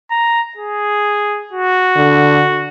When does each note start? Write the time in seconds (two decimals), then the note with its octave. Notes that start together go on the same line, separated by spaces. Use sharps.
0.11 A#5
0.57 G#4
1.53 F#4
1.96 D3